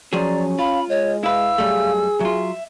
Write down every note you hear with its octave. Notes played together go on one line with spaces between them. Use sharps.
F3 F#3 C#4 G#4 D5 A#5
F4 F5 B5
G#3 C#5 D#5
E4 B4 F5 E6
F#2 G3 A3 G#4
F#3 F4 E5